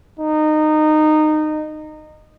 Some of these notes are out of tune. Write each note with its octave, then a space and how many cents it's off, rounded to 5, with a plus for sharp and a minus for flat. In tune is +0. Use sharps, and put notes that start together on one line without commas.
D#4 -20